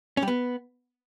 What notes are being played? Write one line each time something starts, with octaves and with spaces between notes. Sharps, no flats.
C#4
G3
B3